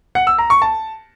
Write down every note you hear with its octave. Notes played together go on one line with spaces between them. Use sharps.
F#5
E6
A#5
C#6
A5